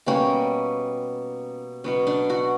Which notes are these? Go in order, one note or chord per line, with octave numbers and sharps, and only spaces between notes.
B2 G3 A#3 C#4
B2 F#3 B3 C#4
D4
F#4